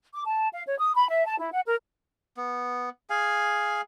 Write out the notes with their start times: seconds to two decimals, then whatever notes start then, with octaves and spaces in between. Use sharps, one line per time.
0.14 D6
0.26 A5
0.53 F5
0.67 C#5
0.79 D#6
0.94 B5
1.10 E5
1.26 A5
1.39 E4
1.53 F#5
1.66 A#4
2.37 B3
3.10 G#4 F5 G#5